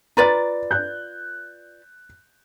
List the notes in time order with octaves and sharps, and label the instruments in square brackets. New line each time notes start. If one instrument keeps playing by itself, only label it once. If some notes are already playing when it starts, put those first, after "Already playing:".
[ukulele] F4 B4 D5 [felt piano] A#5 A6
[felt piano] F#6 G6